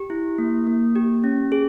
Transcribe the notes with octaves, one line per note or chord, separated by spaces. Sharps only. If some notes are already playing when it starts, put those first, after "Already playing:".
Already playing: G4
E4
A#3
A#3
G4
C#4
G#4